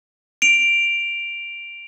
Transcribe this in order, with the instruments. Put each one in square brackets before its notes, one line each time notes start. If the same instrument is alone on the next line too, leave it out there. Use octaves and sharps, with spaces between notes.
[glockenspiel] D7 F7